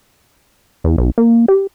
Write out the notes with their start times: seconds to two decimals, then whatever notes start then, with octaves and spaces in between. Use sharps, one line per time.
0.84 E2
0.98 B1
1.18 A#3
1.48 G4